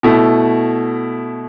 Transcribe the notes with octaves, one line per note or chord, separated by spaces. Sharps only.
B2 A3 E4